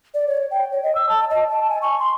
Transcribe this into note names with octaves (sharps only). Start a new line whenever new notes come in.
D5
C#5
G5
C#5
D#5
E6
A5
D#5
A5
G#5
C#6
C6